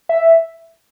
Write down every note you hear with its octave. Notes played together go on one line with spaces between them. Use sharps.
E5